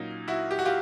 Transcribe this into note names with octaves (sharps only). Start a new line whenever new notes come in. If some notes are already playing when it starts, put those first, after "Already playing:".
Already playing: A#2 F#3 A#3 C#4 D#4
E4 F#4
G4
F#4
F4 G4